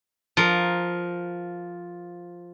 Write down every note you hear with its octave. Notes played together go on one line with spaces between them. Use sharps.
F3 A#4